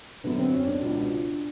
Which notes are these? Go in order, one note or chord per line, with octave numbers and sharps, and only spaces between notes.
F#2 D3 B3
C4
C#4
D4
C#2 B2